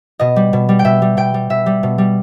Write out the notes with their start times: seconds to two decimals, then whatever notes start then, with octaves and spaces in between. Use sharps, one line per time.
0.19 B2 D#5
0.36 G3
0.53 B2
0.69 G3
0.79 G5
0.85 B2 E5
1.02 G3
1.17 B2 G5
1.34 G3
1.50 B2 E5
1.66 G3
1.83 B2
1.98 G3